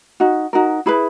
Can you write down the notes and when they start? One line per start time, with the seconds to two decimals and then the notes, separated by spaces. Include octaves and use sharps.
0.20 D#4 F#4
0.53 D#4 F#4 A#4
0.86 E4 G#4 B4 B5